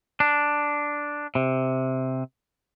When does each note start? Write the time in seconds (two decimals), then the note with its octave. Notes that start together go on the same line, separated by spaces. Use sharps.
0.20 D4
1.35 C3